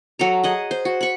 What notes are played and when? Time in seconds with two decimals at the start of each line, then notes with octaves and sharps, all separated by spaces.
0.19 F#3 A4 A#5
0.44 G#4 D#5 F#5
0.71 C5
0.85 F#4
1.01 B5 C#6